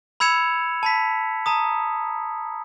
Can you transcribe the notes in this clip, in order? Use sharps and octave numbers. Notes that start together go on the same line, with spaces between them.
B5 E6 G#6 C#7 E7 F7
A5 B5 B6
A5 A#5 D#6